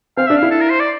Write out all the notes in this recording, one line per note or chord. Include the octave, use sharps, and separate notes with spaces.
C4 F5
D4 E5
F5
E4
A4
A#4
C5
D5